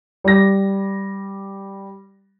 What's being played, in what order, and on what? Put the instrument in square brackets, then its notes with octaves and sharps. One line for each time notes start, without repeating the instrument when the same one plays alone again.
[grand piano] G3 A#6